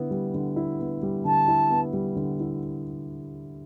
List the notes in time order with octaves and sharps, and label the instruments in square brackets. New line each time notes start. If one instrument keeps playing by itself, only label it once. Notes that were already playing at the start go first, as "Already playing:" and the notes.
Already playing: [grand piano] D3 B3 E4
G3
D3
E4
B3
G3
[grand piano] D3 [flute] A5
[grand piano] E4
B3
G3
D3
E4